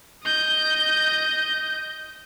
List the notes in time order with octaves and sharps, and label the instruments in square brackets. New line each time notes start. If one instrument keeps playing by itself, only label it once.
[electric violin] D#5 G6